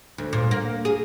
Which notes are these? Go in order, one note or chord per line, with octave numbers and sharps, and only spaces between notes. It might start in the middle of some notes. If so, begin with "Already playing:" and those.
D2
A#2
A#3
G#4